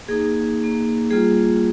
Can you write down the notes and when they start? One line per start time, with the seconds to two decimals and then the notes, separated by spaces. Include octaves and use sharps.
0.08 A#3 D#4 G#4
0.60 A#3 D#4
1.10 G3 A#3 F4 G#4